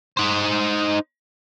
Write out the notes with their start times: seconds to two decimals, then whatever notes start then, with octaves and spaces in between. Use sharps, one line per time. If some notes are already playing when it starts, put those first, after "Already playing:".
0.17 D#4 C5